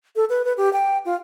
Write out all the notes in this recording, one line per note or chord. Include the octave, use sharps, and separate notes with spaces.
A4
B4
B4
G4
G5
F4